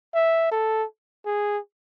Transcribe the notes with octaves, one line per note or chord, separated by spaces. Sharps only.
E5
A4
G#4